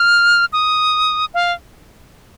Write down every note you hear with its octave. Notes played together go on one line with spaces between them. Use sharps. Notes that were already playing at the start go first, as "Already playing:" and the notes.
Already playing: F6
D#6
F5